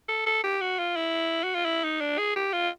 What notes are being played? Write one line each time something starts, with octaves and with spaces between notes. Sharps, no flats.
A4
A4
G4
F#4
F4
E4
F#4
F4
E4
D#4
D4
G#4
G4
F4